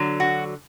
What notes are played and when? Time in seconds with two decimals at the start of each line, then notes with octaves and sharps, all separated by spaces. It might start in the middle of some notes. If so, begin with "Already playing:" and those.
Already playing: D3 F#3
0.20 F#4